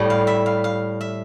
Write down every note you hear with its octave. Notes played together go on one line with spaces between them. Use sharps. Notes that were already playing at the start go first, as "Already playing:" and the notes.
Already playing: A2 G3
F5
E5
F5
F5
E5